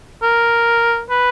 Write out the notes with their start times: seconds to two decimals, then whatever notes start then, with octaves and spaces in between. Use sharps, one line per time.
0.22 A#4
1.10 B4